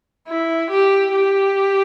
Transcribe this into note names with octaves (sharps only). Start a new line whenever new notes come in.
E4
G4
G4